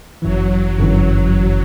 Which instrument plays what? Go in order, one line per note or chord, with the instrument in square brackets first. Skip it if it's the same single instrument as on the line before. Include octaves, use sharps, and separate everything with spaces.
[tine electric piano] G1 F#2 E3 [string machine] F#3
[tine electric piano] G1 F#2 E3